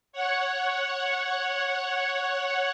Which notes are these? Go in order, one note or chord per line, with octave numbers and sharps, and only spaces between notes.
C#5 F#5